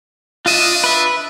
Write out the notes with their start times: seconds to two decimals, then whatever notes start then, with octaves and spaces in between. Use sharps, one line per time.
0.46 D4 F4 D#5 E5
0.84 B4 E5